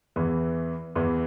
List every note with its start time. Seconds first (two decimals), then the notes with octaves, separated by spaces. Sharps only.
0.16 E2 E3
0.95 E2 E3